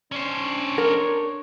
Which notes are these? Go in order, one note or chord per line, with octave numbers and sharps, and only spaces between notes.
C#4 D4 C5 C#5
A#4